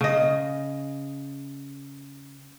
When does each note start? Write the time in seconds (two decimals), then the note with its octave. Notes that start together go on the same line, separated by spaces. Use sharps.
0.01 C#3 D#5